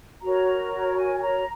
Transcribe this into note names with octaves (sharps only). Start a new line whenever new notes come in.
F#4 A#4 C#5 A#5
G#5
G#5
A#5